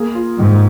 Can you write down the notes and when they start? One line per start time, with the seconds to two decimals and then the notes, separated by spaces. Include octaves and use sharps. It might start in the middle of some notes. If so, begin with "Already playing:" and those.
Already playing: A#3 G#4
0.15 F4
0.38 G#2 D#3